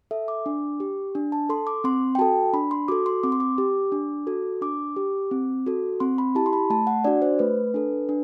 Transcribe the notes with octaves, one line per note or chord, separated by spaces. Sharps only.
A4 E5
D6
D4
G4
D4
A5
A4 C6
D6
C4 C6
G5
F#4 A4 A5
D4 B5
C6
F#4 A4 D6
C6
C4 D6
C6
D6
G4
D4
F#4 A4
D4 D6
G4
C4
F#4 A4
C4 C6
B5
E4 G4 A5
C6
B5
A3 A5
F#5
D4 F#4 D5
C5
A3 B4
D4 A4
D4